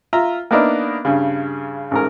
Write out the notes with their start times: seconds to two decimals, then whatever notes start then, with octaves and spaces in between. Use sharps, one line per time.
0.13 F4 E5 A#5
0.51 A#3 B3 D4 D#4 A#4 E5
1.05 G2 C#3
1.91 A1 G#2 A#4